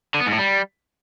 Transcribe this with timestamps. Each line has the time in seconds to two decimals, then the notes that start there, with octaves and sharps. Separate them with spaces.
0.14 D3
0.20 B3
0.26 G#2
0.32 A2
0.38 G3